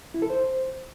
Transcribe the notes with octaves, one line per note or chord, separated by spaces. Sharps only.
E4
A4
C5